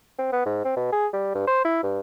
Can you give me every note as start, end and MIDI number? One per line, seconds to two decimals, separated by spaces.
0.19 0.28 60
0.32 0.45 59
0.46 0.60 44
0.65 0.73 60
0.77 0.88 47
0.92 1.07 68
1.13 1.32 55
1.35 1.43 43
1.47 1.63 72
1.65 1.81 64
1.83 2.00 43